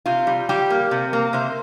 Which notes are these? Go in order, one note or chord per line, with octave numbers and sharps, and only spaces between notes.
C3 F4
G3
G3 G4
A#3
C3
A#3
C3 C5